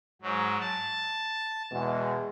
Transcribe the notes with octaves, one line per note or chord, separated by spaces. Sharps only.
G#2 F#3
A5
E2 B2 G#3